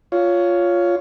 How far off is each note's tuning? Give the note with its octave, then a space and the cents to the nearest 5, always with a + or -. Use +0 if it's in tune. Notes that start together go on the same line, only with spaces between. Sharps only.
F4 +0 C#5 +15